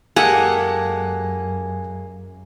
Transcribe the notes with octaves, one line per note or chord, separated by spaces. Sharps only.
F#2 G#3 A#3 G4 A4 F#5 G#5